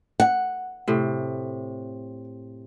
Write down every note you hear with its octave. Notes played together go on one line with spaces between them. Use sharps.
F#5
A2 C3